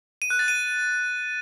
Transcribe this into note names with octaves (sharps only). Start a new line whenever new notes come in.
D#7
F#6
A6
D#7